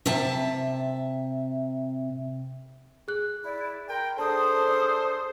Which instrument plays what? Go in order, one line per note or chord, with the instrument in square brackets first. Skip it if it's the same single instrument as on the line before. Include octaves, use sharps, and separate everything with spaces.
[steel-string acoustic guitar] C3 E5 A5
[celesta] G#4 F#6
[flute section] E4 D5
[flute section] A#4 C6 [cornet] G5
[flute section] D4 D#6 [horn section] G#4 A4 [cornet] C5 [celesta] A5